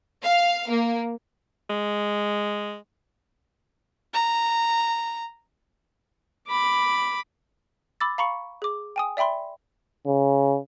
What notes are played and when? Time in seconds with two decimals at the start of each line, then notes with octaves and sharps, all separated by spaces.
0.22 F5
0.69 A#3
1.70 G#3
4.14 A#5
6.47 B5 D6
8.01 B5 D6 E6 A6
8.18 F5 A#5 B5 C#6 C#7
8.62 G#4 D6
8.96 G5 G#5 D#6
9.17 D5 E5 G5 B5 C6
10.07 C#3